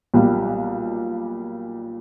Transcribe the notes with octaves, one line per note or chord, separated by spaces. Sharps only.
B1 A#2 G3